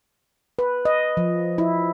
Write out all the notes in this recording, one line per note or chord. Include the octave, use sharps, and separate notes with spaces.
B4
D#5
F3
E4